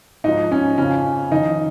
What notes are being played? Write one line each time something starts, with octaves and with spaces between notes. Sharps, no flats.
G#2 F3 D#4
C#4
F2 C#3 F3 C#4
F2 D#3 D#4